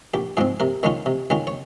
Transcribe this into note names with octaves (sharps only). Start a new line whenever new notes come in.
A#1 G4
G#2 F3 G#3 C4 G#4
C3 A#4
D#3 G#3 C#4 F4 C#5
C3
D#3 G#3 C#4 F4
C#5